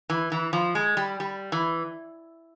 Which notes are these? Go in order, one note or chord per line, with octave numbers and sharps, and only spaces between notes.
E3
E3
F3
G#3
G3
G3
E3